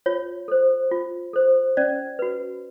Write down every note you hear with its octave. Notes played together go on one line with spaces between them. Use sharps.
F4 C#5
A4 C5
F4
A4 C5
C#4 D5
F#4 B4